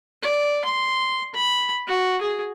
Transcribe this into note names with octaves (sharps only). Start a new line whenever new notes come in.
D5
C6
B5
F#4
G#4